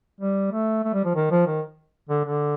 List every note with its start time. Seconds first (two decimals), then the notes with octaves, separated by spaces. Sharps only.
0.20 G3
0.52 A3
0.84 A3
0.94 G3
1.04 F3
1.15 D#3
1.31 F3
1.47 D#3
2.09 D3
2.25 D3